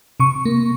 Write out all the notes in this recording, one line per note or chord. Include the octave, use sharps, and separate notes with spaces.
C3 C#6
A#3